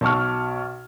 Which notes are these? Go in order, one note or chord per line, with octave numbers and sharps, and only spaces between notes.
B1 A5 C#6 F6